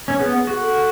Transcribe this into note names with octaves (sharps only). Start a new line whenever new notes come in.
C#4
B3 G#4
F#4
A4